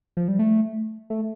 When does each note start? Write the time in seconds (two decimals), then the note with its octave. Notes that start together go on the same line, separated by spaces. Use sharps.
0.17 F3
0.28 G3
0.39 A3
1.10 A3